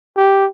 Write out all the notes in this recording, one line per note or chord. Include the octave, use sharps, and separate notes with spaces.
G4